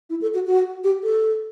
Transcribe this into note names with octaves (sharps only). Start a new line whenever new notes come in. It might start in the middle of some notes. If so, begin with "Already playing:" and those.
E4
A4
F#4
F#4
G4
A4